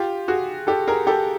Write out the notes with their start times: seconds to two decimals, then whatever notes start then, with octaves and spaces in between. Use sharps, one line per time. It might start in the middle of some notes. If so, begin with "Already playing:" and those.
Already playing: F4 G4
0.28 F#4 G#4
0.67 G4 A4
0.88 G#4 A#4
1.07 G4 A4